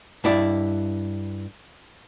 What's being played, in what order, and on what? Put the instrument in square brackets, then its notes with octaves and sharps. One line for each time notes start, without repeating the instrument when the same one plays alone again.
[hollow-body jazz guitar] G2 E4 D5